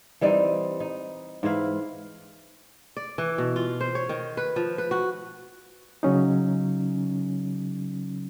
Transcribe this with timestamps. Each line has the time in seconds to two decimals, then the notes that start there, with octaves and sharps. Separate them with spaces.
0.21 E3 G3 C4 D#4
0.80 D#4
1.43 G#2 E3 E4 F5
2.97 D5
3.18 E3
3.38 B2
3.56 F4
3.81 C5
3.95 C#5
4.09 D#3
4.37 B4
4.56 F3
4.78 B4
4.91 F#4
6.03 C#3 F#3 C#4 D#4